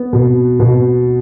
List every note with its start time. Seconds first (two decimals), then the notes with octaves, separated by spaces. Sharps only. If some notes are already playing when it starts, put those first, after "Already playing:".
Already playing: B3
0.13 B2
0.60 B2